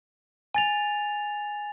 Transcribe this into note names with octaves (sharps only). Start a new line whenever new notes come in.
G#5 A6 F7